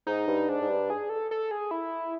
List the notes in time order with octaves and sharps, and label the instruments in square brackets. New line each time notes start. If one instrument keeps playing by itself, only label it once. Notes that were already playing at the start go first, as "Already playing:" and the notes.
[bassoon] G#2 [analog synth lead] D#4
[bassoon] G2
[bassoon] G#2 [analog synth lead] D4
[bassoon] G#2
G2
[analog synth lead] G#4
A4
A4
G#4
E4